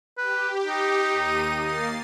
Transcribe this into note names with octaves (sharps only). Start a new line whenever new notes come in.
G4 B4
D#4
D#2 D#7
A#3 A6 C7